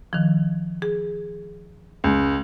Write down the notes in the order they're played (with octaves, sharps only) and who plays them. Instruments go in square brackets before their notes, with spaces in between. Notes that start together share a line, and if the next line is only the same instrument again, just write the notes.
[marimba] D#3 F3
G#4
[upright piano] C#2